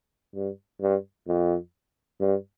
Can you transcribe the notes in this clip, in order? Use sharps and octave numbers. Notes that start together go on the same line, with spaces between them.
G2
G2
F2
G2